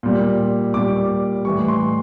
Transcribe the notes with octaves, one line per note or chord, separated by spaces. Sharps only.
A#2 G3
A#2 G3 D6
A2 E3 G3 C#6
C6